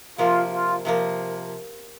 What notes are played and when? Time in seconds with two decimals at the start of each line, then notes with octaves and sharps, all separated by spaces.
0.18 C3 F3 A#3 F4
0.52 F4
0.85 C3 F3 A#3